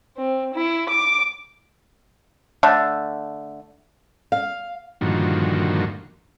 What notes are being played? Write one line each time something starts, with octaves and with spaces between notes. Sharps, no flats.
C4
E4
D6
D3 A3
F5
G2 A#2 D3 D#3 F3 F#4